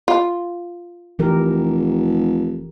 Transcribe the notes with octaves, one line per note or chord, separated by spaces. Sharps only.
F4
F1 E3 G4 A#4